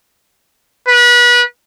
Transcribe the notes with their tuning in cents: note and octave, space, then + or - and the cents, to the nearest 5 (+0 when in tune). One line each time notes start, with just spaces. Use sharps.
B4 -30